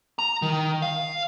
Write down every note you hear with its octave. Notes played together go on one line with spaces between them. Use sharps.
A#5
D#3
F5